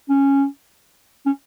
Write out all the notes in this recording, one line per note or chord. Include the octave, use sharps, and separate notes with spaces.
C#4
C#4